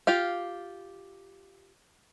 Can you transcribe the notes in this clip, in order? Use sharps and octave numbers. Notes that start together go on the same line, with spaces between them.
F4 G4 F5